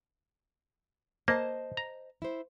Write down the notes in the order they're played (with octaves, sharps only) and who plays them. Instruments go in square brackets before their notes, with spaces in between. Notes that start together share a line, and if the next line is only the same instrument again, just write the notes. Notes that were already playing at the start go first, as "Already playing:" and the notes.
[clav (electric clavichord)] A#3 [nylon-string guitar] C5 D#5 A5
[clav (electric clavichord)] A#5
[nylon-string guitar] E4 C5